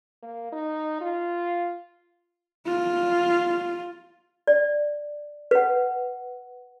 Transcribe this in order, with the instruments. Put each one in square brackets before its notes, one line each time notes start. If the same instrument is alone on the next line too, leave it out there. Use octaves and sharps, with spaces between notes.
[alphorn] A#3
D#4
F4
[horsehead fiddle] F4
[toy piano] D5
B4 F#5